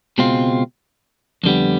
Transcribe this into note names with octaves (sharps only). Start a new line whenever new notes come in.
C#2 B2 G#3 C4 F4
F2 D3 G3 B3